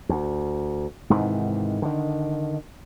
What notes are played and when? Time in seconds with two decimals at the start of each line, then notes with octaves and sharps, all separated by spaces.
0.09 D2
1.10 G#2 C3 D#3 E3
1.82 D3 D#3